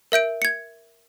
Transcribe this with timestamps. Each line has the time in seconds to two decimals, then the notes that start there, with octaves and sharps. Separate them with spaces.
0.12 A#4 E5 G6 D7
0.42 G#6 C#7